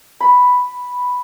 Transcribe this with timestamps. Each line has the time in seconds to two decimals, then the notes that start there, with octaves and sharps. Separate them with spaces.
0.20 B5